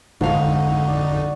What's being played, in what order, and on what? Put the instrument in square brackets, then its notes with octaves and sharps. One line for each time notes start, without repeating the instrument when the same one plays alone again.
[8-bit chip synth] G#1 F2 D#4 [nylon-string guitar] G#2 F5 [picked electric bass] D3 D4 [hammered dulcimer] F#4
[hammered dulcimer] D5